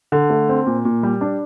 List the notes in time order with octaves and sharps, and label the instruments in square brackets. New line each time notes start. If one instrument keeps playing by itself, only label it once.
[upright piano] D3
A3
C4
A#2
A#2
G3
D4